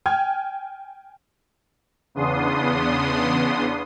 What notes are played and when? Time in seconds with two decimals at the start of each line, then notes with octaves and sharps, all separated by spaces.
0.06 G5 G#5 F6 G#6
2.15 E2 C#3 B3 D4 C6 D#6